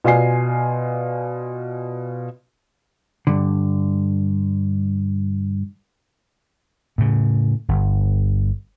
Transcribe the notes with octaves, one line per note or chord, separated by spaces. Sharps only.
B2 F4 D5 G#5 C7
G2 D3
A2 C#3
G1